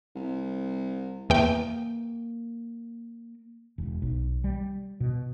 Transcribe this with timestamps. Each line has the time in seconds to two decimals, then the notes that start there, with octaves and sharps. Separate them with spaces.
0.16 C2
1.30 E2 A#3 G5
3.78 E1
4.02 B1
4.44 G3
5.00 B2